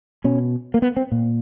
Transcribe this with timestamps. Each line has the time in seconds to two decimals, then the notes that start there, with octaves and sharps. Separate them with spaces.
0.24 B2 C#4
0.74 A#3
0.82 B3
0.97 C4
1.12 A#2